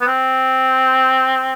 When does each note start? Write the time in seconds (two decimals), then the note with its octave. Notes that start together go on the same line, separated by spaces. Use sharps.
0.01 B3
0.07 C4